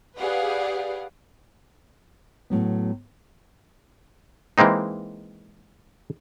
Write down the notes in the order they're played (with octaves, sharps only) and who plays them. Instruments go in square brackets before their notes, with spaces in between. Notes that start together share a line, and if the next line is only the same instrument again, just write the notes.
[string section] G4 G#4 B4 D5 F5 F#5
[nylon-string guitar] A2 F#3 B3
[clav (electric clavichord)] E3 G#3 A#3 C4 D#4